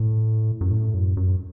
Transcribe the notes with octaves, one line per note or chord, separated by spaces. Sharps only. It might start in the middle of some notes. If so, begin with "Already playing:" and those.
Already playing: A2
F#2
A2
F#2
F#2